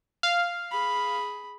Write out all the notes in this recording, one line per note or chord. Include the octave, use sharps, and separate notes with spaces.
F5
G#4 B5